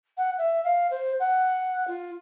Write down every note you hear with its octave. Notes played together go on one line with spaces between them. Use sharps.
F#5
E5
F5
C5
F#5
F4